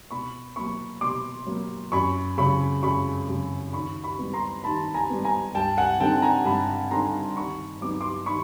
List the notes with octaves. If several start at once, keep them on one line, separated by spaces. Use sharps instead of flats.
B2 B5 C#6
F#3 A#3 B5 C#6
B2 C6 D6
F#3 A#3
F#2 B5 C#6
C#3 F#3 B5 C#6
F#2 B5 C#6
C#3 F#3
D#3 B5 C#6
B5 C#6
G3 B3
A#5 C6
D#3 A5 B5
G#5 A#5
G3 B3
G#5 A#5
G2 G5 A5
F#5 G#5
D3 G3 C4 D#4 G5 A5
G#5 A#5
G2 A5 B5
D3 G3 C4 D#4 A#5 C6
D#3 B5 C#6
F#3 B3 D#4 D6
C6 D6
D#3 B5 C#6